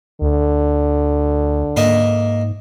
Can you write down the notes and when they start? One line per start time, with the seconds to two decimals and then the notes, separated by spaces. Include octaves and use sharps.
0.21 D2 D3
1.76 G#2 A#3 D#4 E5